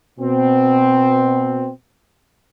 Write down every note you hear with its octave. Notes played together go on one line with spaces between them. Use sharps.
B2 C4